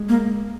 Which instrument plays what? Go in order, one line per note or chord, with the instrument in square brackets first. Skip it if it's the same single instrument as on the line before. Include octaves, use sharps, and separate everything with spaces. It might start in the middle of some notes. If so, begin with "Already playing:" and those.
Already playing: [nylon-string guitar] G#3
[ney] A#3